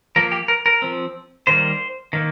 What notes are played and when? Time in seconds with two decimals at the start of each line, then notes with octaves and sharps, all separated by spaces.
0.16 F3 A#3 A#4
0.32 G4
0.48 A#4
0.66 A#4
0.82 F3 C4
1.47 D#3 G3 A#3 C5
2.13 D#3 A#3